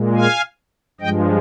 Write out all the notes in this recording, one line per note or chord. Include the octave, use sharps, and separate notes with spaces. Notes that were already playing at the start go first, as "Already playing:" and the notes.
Already playing: A#2 G#3
F5 G#5
G2 F3 G#3 D#5 G5